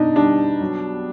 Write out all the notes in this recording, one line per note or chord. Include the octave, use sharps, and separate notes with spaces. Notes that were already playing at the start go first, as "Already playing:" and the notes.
Already playing: B2 D4 D#4
G3 D4
F#3